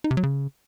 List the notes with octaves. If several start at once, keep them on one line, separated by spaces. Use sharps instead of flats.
D#4
C3
F#3
C#3